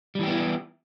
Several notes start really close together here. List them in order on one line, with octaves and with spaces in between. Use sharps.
G3 E3 G4 B3 E4